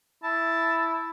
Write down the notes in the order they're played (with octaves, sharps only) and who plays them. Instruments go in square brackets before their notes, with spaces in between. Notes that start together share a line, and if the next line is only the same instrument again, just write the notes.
[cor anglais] E4 [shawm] A5